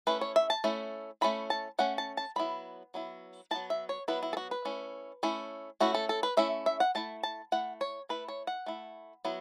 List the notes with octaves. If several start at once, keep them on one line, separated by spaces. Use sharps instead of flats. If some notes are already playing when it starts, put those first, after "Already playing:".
A3 C#4 E4 B4
C#5
E5
A5
A3 C#4 E4
A3 C#4 E4 B5
A5
A3 C#4 F#5
A5
A5
F#3 B3 E4 B5
F#3 B3 E4
F#3 B3 E4 A5
E5
C#5
F#3 B3 E4 B4
E4
A4
F#4
B4
A3 C#4 E4
A3 C#4 E4
A3 C#4 E4 F#4
A4
A4
B4
A3 C#4 E4 E5
E5
F#5
A3 E4 A5
A5
A3 E4 F#5
C#5
A3 E4 B4
C#5
F#5
A3 E4
F#3 B3 E4